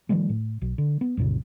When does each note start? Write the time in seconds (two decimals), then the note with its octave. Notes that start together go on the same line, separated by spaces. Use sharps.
0.09 D#3 F3 G3 A3
0.29 A2
0.62 B1
0.78 D3
1.01 B3
1.17 C2 F#2 A#2 C#3